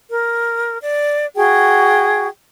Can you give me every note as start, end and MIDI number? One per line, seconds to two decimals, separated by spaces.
0.09 0.78 70
0.82 1.24 74
1.35 2.28 66
1.35 2.28 68
1.35 2.28 79